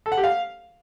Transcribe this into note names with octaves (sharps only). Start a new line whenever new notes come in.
A4
F#5
G4
F5